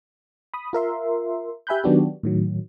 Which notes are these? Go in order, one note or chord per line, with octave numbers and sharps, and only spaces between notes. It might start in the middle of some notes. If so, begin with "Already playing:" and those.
B5 D#6
F4 A#4 E5 C6
G4 E5 G#5 B5 F#6 G6
D#3 F#3 B3 D4 F#4 G4
A2 D#3 F#3